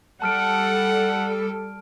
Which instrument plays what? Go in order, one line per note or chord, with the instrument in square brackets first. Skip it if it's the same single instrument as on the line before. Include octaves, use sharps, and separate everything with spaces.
[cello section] G3 A4 [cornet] F#5 [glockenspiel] A5 F6 D7